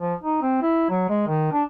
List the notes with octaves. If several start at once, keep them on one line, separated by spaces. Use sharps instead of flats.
F3
D#4
C4
E4
F#3
G#3
D#3
D4